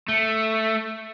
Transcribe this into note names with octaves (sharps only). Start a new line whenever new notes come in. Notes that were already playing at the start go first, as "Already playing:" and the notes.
A3